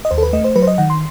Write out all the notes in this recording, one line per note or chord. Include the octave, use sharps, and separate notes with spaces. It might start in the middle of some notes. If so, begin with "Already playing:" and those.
D#5
D#2 C5
A4
B4
A3 D#5
C5
F#3 B4
C5
D#5
D#3 F#5
C6